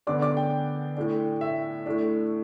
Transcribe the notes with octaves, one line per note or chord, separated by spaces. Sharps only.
D3 B3 D4 D5 D6
D5 D6
G5
A2 A3 D4
E5
A2 A3 D4